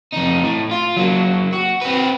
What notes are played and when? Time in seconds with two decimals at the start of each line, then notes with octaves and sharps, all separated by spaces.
0.12 F2 D#4
0.44 A2
0.71 F4
0.97 F#3 A#3
1.53 F#4
1.81 C4 B4